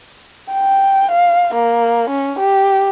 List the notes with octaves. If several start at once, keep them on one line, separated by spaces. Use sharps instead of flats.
G5
F5
A#3
C#4
G4